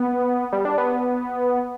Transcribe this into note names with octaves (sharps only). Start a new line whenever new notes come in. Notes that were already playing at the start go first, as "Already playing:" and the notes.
Already playing: B3
G3
D4
B3